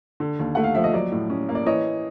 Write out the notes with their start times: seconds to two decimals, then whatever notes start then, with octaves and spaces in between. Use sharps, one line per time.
0.20 D3
0.39 D#2
0.55 A3 F#5
0.64 F5
0.75 F3 E5
0.84 D#5
0.93 F#3 D5
1.12 A2
1.30 C#4
1.49 A#3
1.55 D5
1.66 E3 C#5 D#5